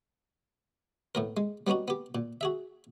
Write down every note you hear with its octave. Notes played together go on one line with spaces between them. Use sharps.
A2 B3 A#4
G#3
G3 B3 C#4 D#4 F#4
B3 G4
A#2
F#4 G#4 E5